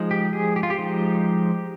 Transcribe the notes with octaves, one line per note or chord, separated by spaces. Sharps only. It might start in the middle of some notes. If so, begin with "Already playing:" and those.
Already playing: F3 G#3 D#4
G4
G#4
G4
F4
G4
F3 G#3 D#4